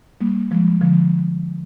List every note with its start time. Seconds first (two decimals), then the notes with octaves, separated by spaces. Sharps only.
0.21 G3 A#3
0.51 F3 G#3
0.81 D3 F3